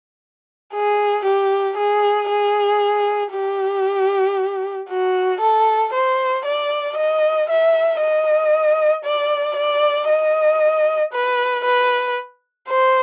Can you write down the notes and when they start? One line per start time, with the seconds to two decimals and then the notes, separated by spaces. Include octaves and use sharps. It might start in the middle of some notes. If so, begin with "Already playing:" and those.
0.74 G#4
1.26 G4
1.77 G#4
2.30 G#4
3.33 G4
4.89 F#4
5.41 A4
5.94 C5
6.45 D5
6.97 D#5
7.49 E5
8.01 D#5
9.05 D5
9.57 D5
10.09 D#5
11.13 B4
11.65 B4
12.69 C5